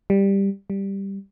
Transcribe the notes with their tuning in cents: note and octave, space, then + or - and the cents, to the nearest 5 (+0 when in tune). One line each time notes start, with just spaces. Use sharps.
G3 +10
G3 +5